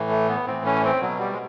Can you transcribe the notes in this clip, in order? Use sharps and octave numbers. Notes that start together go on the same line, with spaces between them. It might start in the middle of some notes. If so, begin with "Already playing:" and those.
Already playing: A2 E3
A3
B3
A2 E3 C4
C#4
C4
B2 F#3
G3
G#3